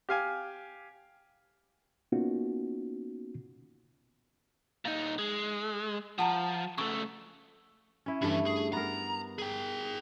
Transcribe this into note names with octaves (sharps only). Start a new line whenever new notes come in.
G4 F5 G#5
A#3 B3 C#4 D#4 F4 F#4
A#2 D#4
G#3
F3 F#5 A5 A#5
C#3 A3 C#6
C#4 E4
G2 E3 A3
G#4
B3 A#4 A#5
G#4 G5